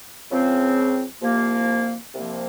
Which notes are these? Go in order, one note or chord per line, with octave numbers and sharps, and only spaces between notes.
C#2 C#3 F3 C4
C2 C3 F3 A#3
C2 C3 F3 A#3